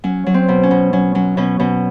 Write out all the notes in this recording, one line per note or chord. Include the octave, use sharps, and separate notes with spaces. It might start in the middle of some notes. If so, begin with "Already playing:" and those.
F#3 C#4
F#3
C4
B2
C#4
B2
F#3 C#4
F#3 C#4
B2 C#4
B2 C#4